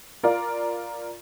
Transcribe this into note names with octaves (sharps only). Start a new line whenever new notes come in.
F4 A#4 D5 F5